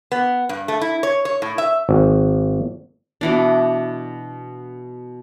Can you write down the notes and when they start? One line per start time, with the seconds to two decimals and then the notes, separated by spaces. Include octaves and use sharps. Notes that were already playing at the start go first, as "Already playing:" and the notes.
0.12 B3
0.49 G2
0.68 A3
0.81 E4
1.03 C#5
1.25 C#5
1.42 A2
1.58 E5
1.89 G#1
3.21 B2 E3 D4